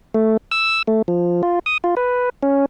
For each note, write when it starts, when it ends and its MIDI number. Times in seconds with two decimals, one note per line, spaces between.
0.15 0.37 57
0.52 0.82 88
0.88 1.02 57
1.08 1.42 53
1.43 1.59 65
1.66 1.78 87
1.84 1.95 65
1.97 2.29 71
2.43 2.66 61